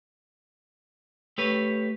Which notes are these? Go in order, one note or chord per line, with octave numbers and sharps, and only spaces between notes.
A3 G4 B4 C#5